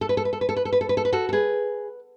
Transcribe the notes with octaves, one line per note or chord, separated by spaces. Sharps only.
A4
B4
A4
B4
A4
B4
A4
B4
A4
B4
A4
B4
A4
B4
F#4 A4
A4
G#4 B4